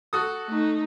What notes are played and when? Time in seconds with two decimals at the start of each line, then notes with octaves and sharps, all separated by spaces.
0.13 F#4 A4 D#6
0.47 A3 D#4